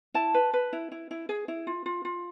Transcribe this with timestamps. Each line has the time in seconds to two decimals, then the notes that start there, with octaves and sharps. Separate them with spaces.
0.14 E4 A5
0.34 B4
0.54 B4
0.73 E4
0.92 E4
1.11 E4
1.29 G#4
1.48 E4
1.67 F4
1.86 F4
2.05 F4